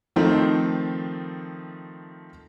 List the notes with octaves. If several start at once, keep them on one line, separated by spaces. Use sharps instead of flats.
D#3 F3 A3 C4 D#4